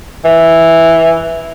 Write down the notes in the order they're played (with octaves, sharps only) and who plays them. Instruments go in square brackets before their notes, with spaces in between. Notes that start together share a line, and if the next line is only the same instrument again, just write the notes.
[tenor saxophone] E3